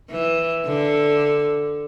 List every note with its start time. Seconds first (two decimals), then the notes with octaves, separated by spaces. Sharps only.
0.11 E3
0.66 D3